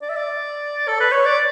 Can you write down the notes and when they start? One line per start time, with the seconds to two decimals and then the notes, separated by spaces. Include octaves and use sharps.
0.01 D5
0.09 E5
0.16 D5
0.88 A4
1.00 B4
1.12 C#5
1.25 D5